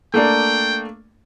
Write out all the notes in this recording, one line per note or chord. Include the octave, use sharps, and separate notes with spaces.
A3 A#3 D4 G5